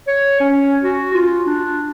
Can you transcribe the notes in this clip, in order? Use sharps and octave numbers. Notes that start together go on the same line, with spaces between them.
C#5
C#4
F#4
F4
D4